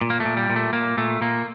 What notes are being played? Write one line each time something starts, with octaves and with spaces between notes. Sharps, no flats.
A#2
A#3
A3
A#2
G3
A#2
A3
A#2 A#3
A#2 A3
A#2 A#3